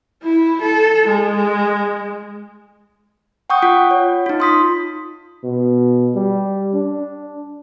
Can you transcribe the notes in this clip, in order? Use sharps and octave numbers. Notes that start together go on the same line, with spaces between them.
E4
A4
G#3
F#5 G5 C#6 D#6 G6
F4 F#5
C#5
D#4 F4
C6 D#6 B6
B2
G3
D4